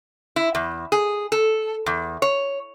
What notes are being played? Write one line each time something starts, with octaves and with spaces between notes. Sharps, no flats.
E4
E2
G#4
A4
E2
C#5